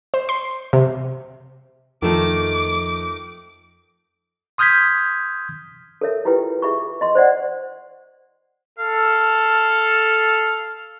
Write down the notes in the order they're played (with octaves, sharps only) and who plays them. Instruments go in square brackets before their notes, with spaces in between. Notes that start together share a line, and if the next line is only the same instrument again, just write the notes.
[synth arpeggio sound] C5
C6
C3
[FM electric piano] F2 F3 [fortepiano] D#3 A3 D#4 [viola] D6
[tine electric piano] C6 D#6 F6 G6 G#6 B6
[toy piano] A4 A#4 C#5 E5
E4 F4 G4 B4 G5
G#4 E5 B5 C#6
D#5 C6
C5 D5 F#5
[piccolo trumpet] A4 [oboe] F5